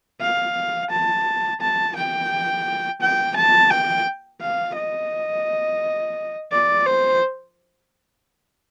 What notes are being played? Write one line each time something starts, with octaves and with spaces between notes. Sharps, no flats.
F5
A5
A5
G5
G5
A5
G5
F5
D#5
D5
C5